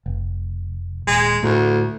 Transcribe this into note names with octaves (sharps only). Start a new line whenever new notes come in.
F1
D#1 G#3
D2 A2